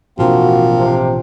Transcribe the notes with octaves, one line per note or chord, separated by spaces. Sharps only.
A1 B2 F3 A#3 C4 D4 F#4
C3